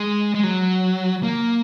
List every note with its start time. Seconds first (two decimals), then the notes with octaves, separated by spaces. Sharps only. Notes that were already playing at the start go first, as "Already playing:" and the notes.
Already playing: G#3
0.35 G#3
0.43 F#3
1.23 A#3